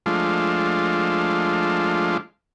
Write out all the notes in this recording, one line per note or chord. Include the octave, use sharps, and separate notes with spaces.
F3 G#3 A3 D4 F4